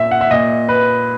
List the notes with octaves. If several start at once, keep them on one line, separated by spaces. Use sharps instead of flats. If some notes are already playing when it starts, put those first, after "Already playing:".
Already playing: A#2 E5
F#5
E5
A#2 D#5
B4